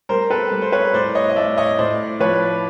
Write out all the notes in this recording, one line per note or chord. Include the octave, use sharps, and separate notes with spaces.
G3 A#4 C5
A4 B4
G3
C5
B4 C#5
A2 C5 D5
C#5 D#5
D#5
A2 D5 E5
C#5 D#5
A2 C5 D5
F3 B4 C#5